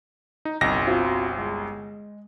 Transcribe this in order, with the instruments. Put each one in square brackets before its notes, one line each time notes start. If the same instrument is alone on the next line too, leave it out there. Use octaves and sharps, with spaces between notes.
[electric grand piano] D#4
[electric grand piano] G1 C2 A#6 [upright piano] D#5
[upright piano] C4 F4 F#4
G#3